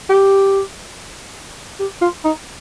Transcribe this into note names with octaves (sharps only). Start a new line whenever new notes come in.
G4
G4
F4
D#4